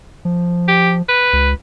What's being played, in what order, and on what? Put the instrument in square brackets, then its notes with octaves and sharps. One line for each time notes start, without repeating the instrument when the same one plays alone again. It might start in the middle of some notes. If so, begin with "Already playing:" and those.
[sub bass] F3
[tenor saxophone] G4
B4
[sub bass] C#2